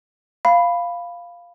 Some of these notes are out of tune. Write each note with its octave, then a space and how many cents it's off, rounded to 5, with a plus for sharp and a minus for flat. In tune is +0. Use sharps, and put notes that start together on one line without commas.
F5 -5 B5 +0